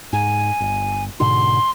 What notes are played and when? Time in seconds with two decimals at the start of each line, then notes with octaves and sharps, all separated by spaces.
0.13 G#2 G#5
0.60 G1
1.20 G#2 B2 D3 C6